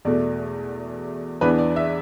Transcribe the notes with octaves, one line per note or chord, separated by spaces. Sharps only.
E2 B2 A3 D5
E2 E3 B3 D4 B4
D5
E5